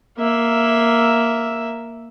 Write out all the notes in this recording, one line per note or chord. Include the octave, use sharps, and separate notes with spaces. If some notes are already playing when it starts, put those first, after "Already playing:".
A#3 E5